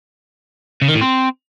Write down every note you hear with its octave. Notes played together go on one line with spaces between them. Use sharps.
C#3
D#3
A2
C4